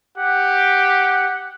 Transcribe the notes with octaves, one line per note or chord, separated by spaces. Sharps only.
G4 F#5